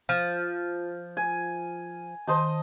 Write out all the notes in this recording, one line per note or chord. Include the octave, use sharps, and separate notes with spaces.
F3
G#5
D#3 C5 D#5 A5